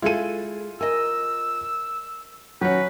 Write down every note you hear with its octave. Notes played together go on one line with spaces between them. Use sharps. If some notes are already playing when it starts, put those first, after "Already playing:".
G#3 E4 F4 G#4 A4 D#7
A#4 D#5 G#5 E6
D#3 F#3 C#4 F#4 B4